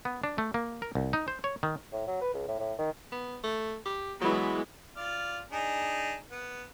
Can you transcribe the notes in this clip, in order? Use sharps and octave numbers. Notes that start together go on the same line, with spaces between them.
B3
D4
A3
A#3
A#4
C2
D#4
C5
C#5
D#3
A2
F#3
B4
C#2
A2
A2
D#3
B3
A3
G4
E3 F#3 G#3 B3
F4 D5 F6
D4 D#4 G#4
B3